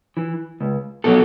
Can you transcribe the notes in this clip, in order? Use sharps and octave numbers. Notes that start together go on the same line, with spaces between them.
E3
C#2
B2 F#3 A4